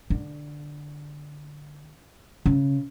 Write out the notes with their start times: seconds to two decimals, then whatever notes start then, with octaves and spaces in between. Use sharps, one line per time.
0.10 D3
2.46 C#3